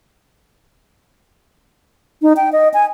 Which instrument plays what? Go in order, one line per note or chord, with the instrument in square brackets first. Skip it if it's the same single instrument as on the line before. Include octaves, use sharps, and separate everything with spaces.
[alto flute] D#4
G5
D#5
G#5